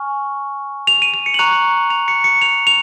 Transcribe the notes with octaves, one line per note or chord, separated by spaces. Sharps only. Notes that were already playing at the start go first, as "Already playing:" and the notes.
Already playing: G#5 C#6 F6
F7
D#7
F7
C#7
F#7
A#5 C#6 F#6 F7
F7
C#7
C#7
F7
F7